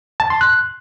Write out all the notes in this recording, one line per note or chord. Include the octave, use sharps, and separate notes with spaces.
A5
C6
F#6